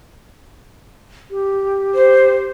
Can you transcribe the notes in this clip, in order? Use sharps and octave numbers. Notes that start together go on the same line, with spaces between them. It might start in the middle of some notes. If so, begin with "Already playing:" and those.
G4
C5